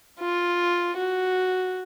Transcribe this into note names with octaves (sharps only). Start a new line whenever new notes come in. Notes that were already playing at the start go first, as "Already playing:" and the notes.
F4
F#4